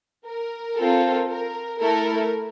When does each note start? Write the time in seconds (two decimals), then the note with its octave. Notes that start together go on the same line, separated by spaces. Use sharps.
0.26 A#4
0.77 C4 F4 A4
1.29 A#4
1.80 A3 E4 A4 A#4